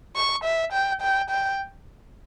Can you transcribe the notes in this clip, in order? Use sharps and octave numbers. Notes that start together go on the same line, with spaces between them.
C#6
E5
G5
G5
G5